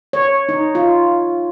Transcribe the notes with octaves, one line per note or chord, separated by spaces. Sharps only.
C#5
D#4
F4